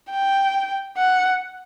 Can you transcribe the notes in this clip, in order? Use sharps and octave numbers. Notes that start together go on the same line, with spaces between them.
G5
F#5